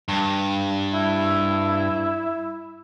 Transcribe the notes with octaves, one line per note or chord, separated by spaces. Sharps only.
G2
E4